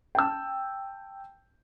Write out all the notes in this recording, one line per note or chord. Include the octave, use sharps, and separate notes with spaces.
G5 A5 E6